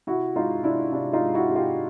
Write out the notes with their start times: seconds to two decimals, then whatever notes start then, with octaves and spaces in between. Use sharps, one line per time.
0.07 C3 E4 F#4
0.36 G#3 D#4 F4
0.64 C3 D4 E4
0.91 C3 D4 E4
1.13 D#4 F4
1.20 G#3
1.34 E4 F#4
1.49 C3
1.55 F4 G4